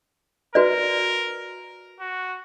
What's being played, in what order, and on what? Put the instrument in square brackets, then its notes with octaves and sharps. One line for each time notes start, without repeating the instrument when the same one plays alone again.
[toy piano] F#4 B4 D5 [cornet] A#4
[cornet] F#4